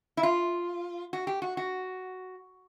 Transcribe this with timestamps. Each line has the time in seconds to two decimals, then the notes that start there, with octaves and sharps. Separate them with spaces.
0.17 E4
0.23 F4
1.13 F#4
1.27 G4
1.42 F#4
1.57 F#4